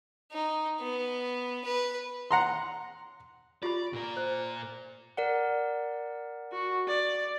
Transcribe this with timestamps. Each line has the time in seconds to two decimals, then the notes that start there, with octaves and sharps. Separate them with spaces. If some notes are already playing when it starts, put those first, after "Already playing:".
0.32 D#4
0.80 B3
1.65 B4
2.31 F#5 A#5 C6
3.63 F4 G4 D5 B5
3.93 A#2 A#4
4.17 C5
5.17 A#4 D5 F#5
6.52 F#4
6.88 D5